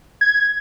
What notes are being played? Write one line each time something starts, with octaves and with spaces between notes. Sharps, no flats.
G#6